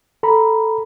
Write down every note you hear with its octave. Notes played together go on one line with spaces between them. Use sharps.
A4 A#5 B5